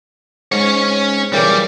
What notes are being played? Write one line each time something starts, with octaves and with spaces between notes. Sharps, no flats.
G#2 C#4 C#5
A#2 C#3 E3 G3 D5